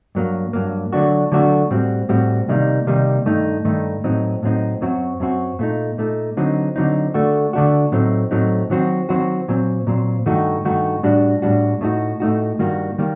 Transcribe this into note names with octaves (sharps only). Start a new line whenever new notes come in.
G2 F#3 A#3
G2 F#3 A#3
D3 F#3 A3 D4 F#4
D3 F#3 A3 D4 F#4
A2 G3 C4 F#4
A2 G3 C4 F#4
C3 D#3 G3 A#3 D#4
C3 D#3 G3 A#3 D#4
G2 D#3 A3 D#4
G2 D#3 A3 D#4
A2 F#3 C4 D#4
A2 F#3 C4 D#4
F#2 F#3 C4 F#4
F#2 F#3 C4 F#4
A#2 A3 D#4
A#2 A3 D#4
D3 F#3 C4 D#4
D3 F#3 C4 D#4
D3 A3 D4 F#4
D3 A3 D4 F#4
A2 F#3 A3 C4 D#4
A2 F#3 A3 C4 D#4
D#3 F#3 C4 F#4
D#3 F#3 C4 F#4
A#2 F#3 C4
A#2 F#3 C4
G2 D#3 A3 D#4 F#4
G2 D#3 A3 D#4 F#4
A2 G3 D4 F#4
A2 G3 D4 F#4
A2 A3 D#4 F#4
A2 A3 D#4 F#4
G2 D#3 G3 A#3 F#4
D#3 G3 A#3